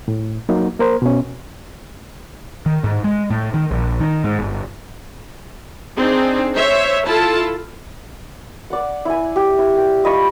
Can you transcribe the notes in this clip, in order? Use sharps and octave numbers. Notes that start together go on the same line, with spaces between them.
A2
F#3 A#3 D#4
A#3 A#4 C5
B2 C#4
D#3
G#2
G#3
A2
D#3
A#1
D#3
G#2
G1
C4 D4 D#4 G#4
C5 C#5 E5
E4 F4 A4 A5
D5 F#5
E4 G#5
G4
E4
G5
F4 D#5 B5 C#6